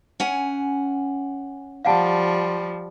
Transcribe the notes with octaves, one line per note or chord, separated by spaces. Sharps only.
C#4 F#5 G#5
F3 G3 F5 F#5 A5